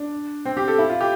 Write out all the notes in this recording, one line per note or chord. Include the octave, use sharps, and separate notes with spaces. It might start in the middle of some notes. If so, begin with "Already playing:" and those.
Already playing: D4
C4
G4
A4
E4
F4
G4